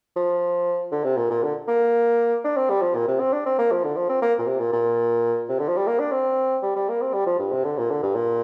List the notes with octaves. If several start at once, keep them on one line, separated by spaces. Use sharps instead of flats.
F3
D3
C3
A#2
A#2
D3
A#3
D4
C4
G3
F3
A#2
C3
C4
D4
C4
A#3
F3
D3
F3
C4
A#3
A#2
C3
A#2
A#2
C3
D3
F3
G3
A#3
D4
C4
G3
G3
A#3
C4
G3
F3
G2
C3
D3
A#2
D3
G2
A#2